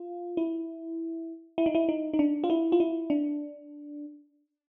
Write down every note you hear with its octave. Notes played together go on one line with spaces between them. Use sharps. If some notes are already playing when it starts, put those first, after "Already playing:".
Already playing: F4
E4
E4
D#4
E4
D#4
D#4
D4
F4
E4
F4
E4
D4